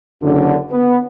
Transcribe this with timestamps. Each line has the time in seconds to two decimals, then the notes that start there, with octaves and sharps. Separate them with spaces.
0.23 F#1 F#2 D3
0.71 B3